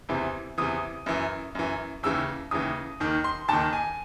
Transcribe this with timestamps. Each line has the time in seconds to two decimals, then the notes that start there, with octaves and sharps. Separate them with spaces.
0.09 E2 C3 E3
0.58 E2 C3 E3 D#6
1.06 F#2 E3
1.55 F#2 E3
2.03 D#2 C#3 E3 E6
2.51 D#2 C#3 E3 D#6
3.00 D#2 D#3
3.24 C6
3.48 D#2 D#3 A5
3.73 G#5